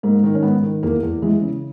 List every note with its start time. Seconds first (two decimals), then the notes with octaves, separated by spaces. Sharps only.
0.03 G#2 A#3
0.23 D#3
0.35 C#4
0.43 G#2 B3
0.63 D#3
0.83 E2 A#3
1.03 E2
1.22 E3 G#3
1.42 C#3